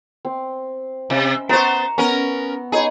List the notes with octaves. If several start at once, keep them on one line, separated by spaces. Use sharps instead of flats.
C4
C3 E5
B3 C5 A#5 C#6
B3 C#4 A#4
D#4 G#4 C#5 B5